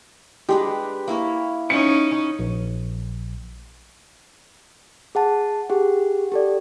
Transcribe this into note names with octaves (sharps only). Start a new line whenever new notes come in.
G#3 D4 G4 B4
A#3 E4 C#5
C#4 D#4 C#7
A#1
G#4 F#5 A5
G4 G#4 F#5
G4 A4 D5